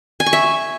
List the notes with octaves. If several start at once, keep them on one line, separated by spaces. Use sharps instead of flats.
G#5
C#6
E5